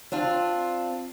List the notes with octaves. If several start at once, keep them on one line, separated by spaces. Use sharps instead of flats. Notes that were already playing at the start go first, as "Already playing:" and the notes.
C4 D4 F4